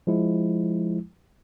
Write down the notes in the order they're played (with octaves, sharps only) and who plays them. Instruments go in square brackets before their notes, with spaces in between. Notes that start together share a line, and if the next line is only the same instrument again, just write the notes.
[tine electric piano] F3 G#3 E4